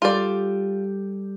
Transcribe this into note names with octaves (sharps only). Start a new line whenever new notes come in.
G3 F4 G4 A4 D5